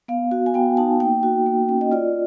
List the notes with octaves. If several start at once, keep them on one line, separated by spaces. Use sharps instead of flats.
B3 F5
F#4
G#5
B3 G5
D#4 A5
A#3 G5
F#4
A#3
C#4
D#5
F4 D5